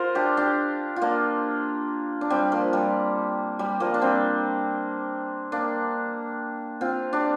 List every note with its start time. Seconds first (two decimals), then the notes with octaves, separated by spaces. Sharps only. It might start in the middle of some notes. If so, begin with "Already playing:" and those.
Already playing: F4 A#4 C5
0.15 D4 G4
0.37 D4 G4
0.96 F4
1.02 A#3 D4
2.21 D4
2.30 G3 C4
2.52 F3 A#3
2.73 G3
3.59 G3
3.80 F3 A#3
3.94 D4
4.02 G3 C4
5.52 A#3 D4
6.81 C4 F4
7.13 D4 G4